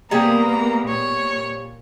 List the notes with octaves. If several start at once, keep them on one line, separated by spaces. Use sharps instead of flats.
C3 G3 A#3 B3 G#4 A#5
A#2 C#5